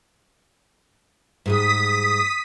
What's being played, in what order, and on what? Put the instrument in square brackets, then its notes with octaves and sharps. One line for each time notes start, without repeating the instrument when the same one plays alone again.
[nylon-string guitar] G#2 G3 G#3 [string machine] D#6 B6